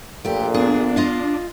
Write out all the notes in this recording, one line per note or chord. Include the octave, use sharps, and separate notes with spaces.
A#1 A#2 A3 G4
B3 D4 G#4
F4 D#5 F5